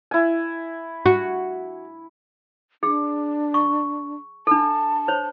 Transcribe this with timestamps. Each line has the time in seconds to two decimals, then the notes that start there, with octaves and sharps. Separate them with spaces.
0.11 E4 G#5
1.06 F#4
2.83 D4 G#4
3.54 C#6
4.47 D4 A4 A5
5.08 C5 C#5